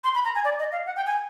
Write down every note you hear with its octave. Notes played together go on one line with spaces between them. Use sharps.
C6
B5
A#5
G#5
D5
D#5
F5
F#5
G5
G#5